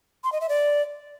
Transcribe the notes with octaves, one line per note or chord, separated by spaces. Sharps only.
C6
D#5
E5
D5